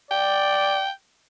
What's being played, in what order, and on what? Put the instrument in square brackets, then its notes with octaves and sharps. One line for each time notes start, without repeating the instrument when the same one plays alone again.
[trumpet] D5 [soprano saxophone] G5